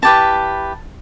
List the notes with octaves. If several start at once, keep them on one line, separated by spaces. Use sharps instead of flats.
E4 G4 B4 A5